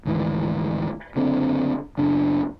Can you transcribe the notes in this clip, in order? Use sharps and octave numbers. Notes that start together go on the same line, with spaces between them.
D2 G#2 D#3 E3
F#1 D3 C4
F#1 C#3 D4